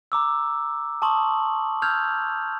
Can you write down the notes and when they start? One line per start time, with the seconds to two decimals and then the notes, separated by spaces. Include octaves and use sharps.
0.12 A#5 D6 E6
1.02 A5 C6 C#6 D#6 F#7
1.82 E6 F6 G6 G#6 F7